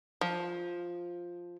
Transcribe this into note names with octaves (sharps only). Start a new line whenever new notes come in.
F3